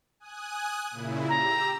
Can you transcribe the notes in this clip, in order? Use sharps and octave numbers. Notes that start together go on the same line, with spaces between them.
G#5 D#6 F#6
A#2 C#3 E4
G4 A#5 E6